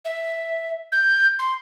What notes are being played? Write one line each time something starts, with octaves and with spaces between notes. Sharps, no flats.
E5
G6
C6